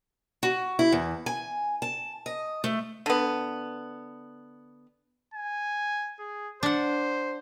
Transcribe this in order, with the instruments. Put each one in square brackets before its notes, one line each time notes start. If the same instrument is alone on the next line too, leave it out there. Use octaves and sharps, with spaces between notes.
[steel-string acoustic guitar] F#4
E4
E2
G#5
A5
D#5
A3
[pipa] D3 B3
[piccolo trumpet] G#5
G#4
[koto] D4 F#5 [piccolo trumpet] C5